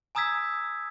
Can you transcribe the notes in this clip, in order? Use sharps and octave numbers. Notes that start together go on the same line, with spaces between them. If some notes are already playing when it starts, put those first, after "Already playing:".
G#5 A#5 D#6 E6 G#6 B6